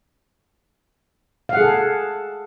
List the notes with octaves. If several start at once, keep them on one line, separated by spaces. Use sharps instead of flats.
G#4 A4 F5 F#5